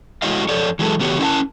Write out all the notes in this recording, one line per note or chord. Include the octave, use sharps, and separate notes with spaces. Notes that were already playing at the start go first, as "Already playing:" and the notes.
G#3 E4 F#4 C#5 D#5 F5
F2 A4 C#5 D5
E3 F#3 G#3 A4
C#3 E3 B3 F#4 G4 C#5
C#4 E4 A#4 F5 A5